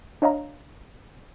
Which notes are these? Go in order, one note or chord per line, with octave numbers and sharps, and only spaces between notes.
D4 C#5 D#5 F5 A#5